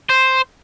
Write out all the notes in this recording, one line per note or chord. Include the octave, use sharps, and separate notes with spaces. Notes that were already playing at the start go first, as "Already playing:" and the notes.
C5